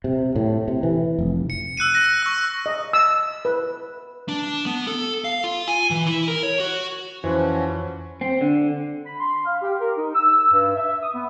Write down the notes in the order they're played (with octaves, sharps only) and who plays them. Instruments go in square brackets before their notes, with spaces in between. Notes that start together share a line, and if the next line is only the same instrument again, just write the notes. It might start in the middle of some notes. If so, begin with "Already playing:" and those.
[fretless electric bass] C3
A2
C3
E3
F1
[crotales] C#7
E6 F#6 C#7 D#7
F#6 A#6
C#6 E6
[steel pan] D#5
E6
B4
[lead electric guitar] D4
B3
A4
F5
F4
G#5
E3
E4
A#4
C#5
F#4
[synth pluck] F2 C5 [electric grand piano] E3 [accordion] F3 C#4 F#4
[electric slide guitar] C4
D3
[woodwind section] B5
C6
F5
G4
A#4
D#4
E6
G2
E5
D#6
B3